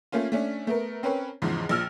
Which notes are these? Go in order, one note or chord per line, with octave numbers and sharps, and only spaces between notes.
A3 A#3 C#4 F4
A3 C#4 D4
A3 B3 A#4
C4 C#4 A#4 B4 C#5
E2 G#2 C#3 F3
A#1 F3 E6 F6